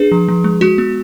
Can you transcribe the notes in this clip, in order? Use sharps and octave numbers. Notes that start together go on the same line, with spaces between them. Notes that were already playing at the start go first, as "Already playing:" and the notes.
Already playing: D4 G#4 B4
F3
F3
G#3
G#3 F#4
B3